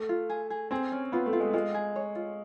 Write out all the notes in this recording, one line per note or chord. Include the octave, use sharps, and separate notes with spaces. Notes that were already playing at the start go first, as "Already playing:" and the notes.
Already playing: A3
F4
G#4
G#4
C4 G#4
C#4
B3 F4
A3
F4
G#3
G#3 F4
G#4
C#5
F4